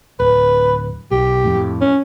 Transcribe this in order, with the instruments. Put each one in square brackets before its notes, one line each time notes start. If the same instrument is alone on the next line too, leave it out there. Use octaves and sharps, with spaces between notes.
[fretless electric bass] D1 [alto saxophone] B4
[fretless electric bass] B1 [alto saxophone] G4
[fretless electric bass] F2 A2
[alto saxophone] C#4